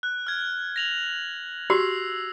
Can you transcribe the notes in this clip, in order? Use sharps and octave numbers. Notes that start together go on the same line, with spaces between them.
F#6
F6 G#6
A#6 F7 F#7
F#4 G4 E6 C7